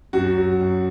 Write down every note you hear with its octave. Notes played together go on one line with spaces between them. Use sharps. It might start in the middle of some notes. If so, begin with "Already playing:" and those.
F#2 F#4
F#3
F#2